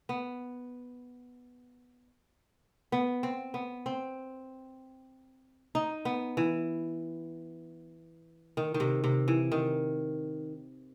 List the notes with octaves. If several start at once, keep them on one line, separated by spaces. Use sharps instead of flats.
B3
B3
C4
B3
C4
D#4
B3
E3
D#3
D#3
C3
C3
E3
D#3